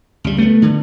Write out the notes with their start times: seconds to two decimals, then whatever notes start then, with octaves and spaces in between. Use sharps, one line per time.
0.24 C#2 G3
0.38 A3 B3
0.62 D3